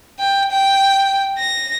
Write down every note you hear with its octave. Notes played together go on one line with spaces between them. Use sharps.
G5
G5
A#6